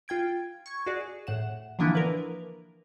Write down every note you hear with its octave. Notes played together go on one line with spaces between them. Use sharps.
F4 G5 G#6 D7
C#6 G#6
F#4 G#4 D5
A2 F#5 E7
D3 E3 F3 A#3 D4 E4
A#4 B4